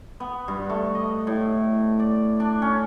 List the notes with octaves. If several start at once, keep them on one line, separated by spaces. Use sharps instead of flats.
B3
G2
A3
D#5
A2
D5
D4
C#4